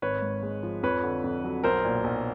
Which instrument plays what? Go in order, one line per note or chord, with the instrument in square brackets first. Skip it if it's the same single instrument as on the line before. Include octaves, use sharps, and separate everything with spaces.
[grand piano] G#1 B4 C#5
G#2
G#3
F3
F2 B4 C#5
D3
F2
F#3
B1 A#4 C5
A#2
B1